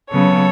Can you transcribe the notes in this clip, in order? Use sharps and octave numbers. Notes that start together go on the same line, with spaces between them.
C#3 F#3 B3 A4 C#5